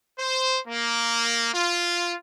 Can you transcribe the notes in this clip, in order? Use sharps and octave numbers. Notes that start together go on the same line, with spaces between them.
C5
A#3
F4